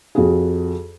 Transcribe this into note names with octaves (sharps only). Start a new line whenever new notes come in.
F2 F#4 G#4